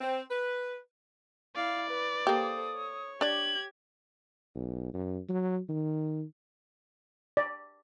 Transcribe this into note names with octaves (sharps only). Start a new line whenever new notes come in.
C4
B4
E4 D5 F5
B4
A#3 G4 A4 C5 D#6
C#5
D4 G4 D5 G#6 F#7
B1
F#2
F#3
D#3
D5